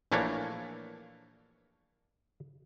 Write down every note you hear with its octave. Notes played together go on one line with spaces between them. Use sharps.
A#1 E3 A3 A#3 D4 C#5